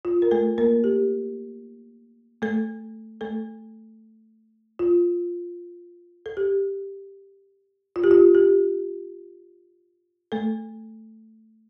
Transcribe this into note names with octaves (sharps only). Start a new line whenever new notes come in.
F4
A#4
A3 A4
A#3 A#4
G4
A3 A4
A3 A4
F4
A4
G4
F4
G4
F4
G4
A3 A4